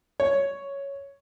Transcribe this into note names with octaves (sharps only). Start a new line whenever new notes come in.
C#5